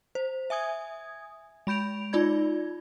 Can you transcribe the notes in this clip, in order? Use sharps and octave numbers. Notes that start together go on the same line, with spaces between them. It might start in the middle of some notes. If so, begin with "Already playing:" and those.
C5
E5 G#5 D#6 G#6
G#3 B5 G6 D7 F7
D#4 F4 D5 B5 G#6